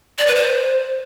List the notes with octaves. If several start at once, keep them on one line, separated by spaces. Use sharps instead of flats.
D5
B4
C5